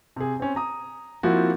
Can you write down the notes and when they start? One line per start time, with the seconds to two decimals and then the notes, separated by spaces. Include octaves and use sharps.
0.16 C3 G#4
0.40 C4 C#4
0.56 A#5 D#6
1.23 F3 A#3 C4 E4 F#4